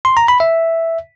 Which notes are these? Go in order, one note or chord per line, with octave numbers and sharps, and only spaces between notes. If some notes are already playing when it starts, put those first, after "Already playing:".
C6
A#5
B5
E5